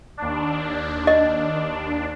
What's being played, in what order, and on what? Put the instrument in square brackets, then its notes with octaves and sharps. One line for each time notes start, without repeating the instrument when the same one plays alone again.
[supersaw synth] D#2 D4
[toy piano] D#5